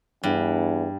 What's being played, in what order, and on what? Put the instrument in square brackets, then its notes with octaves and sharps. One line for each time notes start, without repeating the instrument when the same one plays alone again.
[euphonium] E2 [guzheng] G2